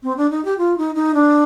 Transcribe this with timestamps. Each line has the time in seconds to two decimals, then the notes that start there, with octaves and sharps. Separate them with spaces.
0.03 C4
0.17 D4
0.31 D#4
0.45 G4
0.58 F4
0.78 D#4
0.95 D#4
1.14 D4